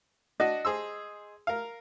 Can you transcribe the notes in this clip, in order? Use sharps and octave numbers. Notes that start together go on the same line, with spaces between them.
D4 F#4 D#5
G#4 C5 E6
A#4 F5